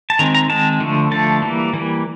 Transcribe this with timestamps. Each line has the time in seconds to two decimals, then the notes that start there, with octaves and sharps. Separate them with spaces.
0.10 A5
0.19 D#3 G#3 C4 A#5
0.35 A#5
0.49 D#3 G#3 C4 A5
0.80 D3 F3 A3
1.11 D3 F3 A3 A5
1.42 E3 G3 A#3
1.73 E3 G3 A#3